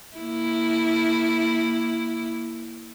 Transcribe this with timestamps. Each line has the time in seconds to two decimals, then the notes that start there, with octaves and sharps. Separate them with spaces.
0.17 A#3 E4